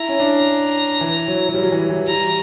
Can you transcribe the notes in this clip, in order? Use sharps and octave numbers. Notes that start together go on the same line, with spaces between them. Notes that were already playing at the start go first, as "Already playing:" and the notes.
Already playing: E4 A#5
C#4
D4
E3
F#3
F#3
G3
F#3
E3
E3
G3 A#5